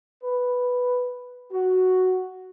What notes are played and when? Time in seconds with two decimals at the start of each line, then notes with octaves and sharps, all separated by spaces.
0.23 B4
1.52 F#4